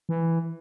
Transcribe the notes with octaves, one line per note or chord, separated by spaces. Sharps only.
E3